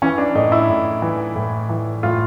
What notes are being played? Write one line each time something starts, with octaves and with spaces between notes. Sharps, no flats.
E3 C#4
D4
A2 D#4
E4
A2
E3
A2
E3
A2 F4